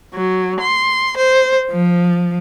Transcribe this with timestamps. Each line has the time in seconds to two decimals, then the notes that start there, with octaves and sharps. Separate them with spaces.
0.14 F#3
0.60 C6
1.16 C5
1.71 F3